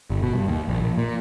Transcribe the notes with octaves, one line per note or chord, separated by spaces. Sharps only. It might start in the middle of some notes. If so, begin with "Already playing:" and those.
G1
B2
G2
D#2
A#1
A#1
A#2